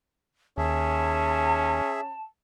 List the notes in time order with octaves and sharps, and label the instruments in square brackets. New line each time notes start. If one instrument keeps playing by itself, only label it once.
[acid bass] D#2 [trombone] C#4 [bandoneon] G#4 E5 [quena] A5